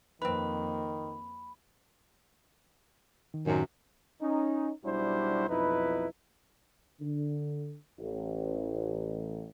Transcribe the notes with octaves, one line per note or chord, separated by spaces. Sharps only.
F2 D#3 A#3 C4 B4 B5
D#3
F#2 A2 C3 D#3
C#4 D#4
B1 G3 D4 E4 F#4 C5
B1 F2 D#4 E4 B4
D3
A1